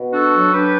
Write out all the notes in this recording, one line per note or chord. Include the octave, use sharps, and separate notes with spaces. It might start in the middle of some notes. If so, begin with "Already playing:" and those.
Already playing: B2
D4 F#4 A4
F#3
D4 G4 B4